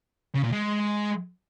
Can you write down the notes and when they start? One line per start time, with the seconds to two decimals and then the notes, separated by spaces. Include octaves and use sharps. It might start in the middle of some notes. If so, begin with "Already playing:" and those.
0.35 C#3
0.44 A#2
0.52 G#3